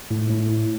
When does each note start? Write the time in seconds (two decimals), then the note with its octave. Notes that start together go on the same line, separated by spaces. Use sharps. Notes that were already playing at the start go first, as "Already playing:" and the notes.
0.11 A2
0.30 A2